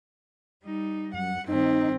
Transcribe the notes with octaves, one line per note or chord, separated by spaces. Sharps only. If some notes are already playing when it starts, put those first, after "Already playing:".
G3 D#4
F#2 F#5
G2 D#3 C4 D#4